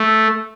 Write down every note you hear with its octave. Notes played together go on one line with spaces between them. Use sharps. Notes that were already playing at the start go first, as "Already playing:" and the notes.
Already playing: A3